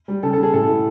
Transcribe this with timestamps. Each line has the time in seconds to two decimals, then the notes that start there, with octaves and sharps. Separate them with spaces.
0.08 G3
0.23 C#3 A4
0.33 A4
0.38 C#3
0.43 G#4
0.53 A2 A4
0.69 A2